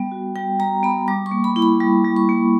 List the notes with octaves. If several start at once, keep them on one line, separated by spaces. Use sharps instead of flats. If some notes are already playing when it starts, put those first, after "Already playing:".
Already playing: G3 B3 G5
F#4
G3 G5
G3 A#5
B3 B5
G3 D6
C#6
A#3
B5
E4
B5
G3
G3
C#6
A#3